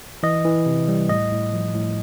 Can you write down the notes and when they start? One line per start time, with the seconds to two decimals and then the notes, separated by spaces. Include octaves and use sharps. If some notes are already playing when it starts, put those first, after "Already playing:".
0.23 E3 D#5
0.45 E3
0.66 C3
0.88 G3
1.09 A2 D#5
1.31 A2
1.53 F3
1.74 A2